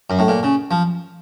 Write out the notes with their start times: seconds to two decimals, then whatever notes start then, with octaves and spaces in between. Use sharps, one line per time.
0.10 F#2
0.19 A2
0.28 A#2
0.43 C#3
0.71 F3